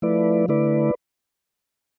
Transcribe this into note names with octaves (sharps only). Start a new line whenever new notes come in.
F3 A3 E4 B4 D5
D3 A3 E4 B4 D5